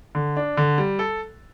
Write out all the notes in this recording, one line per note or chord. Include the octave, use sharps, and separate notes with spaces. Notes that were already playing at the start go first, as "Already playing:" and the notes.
D3
D4
D3
G3
A4